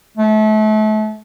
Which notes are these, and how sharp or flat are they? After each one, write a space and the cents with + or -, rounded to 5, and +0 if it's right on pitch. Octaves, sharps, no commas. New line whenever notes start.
A3 -35